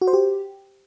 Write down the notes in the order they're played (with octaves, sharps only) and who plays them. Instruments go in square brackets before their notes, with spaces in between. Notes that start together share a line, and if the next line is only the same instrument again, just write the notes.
[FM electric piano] F#4
C5
G4